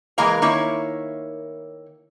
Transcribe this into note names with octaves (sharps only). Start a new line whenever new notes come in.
E3 G#3 A#3 A#4 F5 A#5
D#3 A#3 E4 C#5